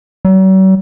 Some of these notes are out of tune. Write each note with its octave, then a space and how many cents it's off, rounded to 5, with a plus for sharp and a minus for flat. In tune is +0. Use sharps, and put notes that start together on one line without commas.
F#3 +45